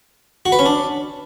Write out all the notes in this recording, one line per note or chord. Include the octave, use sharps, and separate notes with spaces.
F#4
B4
C#4
D4